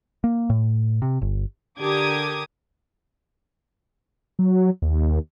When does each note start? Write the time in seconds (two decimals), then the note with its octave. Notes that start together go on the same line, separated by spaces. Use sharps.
0.24 A#3
0.50 A2
1.02 C3
1.22 G1
1.80 D3 G4 A#4 D6 D#6 G#6
4.39 F#3
4.82 D#2